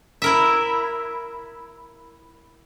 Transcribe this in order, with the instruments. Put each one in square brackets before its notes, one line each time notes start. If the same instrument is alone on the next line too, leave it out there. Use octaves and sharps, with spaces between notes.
[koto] E4 A#4 E5